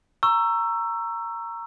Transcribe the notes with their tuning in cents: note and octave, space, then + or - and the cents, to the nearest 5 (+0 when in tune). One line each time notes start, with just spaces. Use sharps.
A#5 -5 C#6 +0 E6 +20